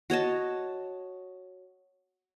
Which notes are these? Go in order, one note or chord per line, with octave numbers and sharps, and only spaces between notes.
F#4 C#5 D#5 A5